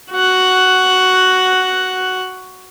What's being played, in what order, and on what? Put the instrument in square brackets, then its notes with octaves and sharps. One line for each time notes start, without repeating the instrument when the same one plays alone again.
[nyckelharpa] F#4 F#5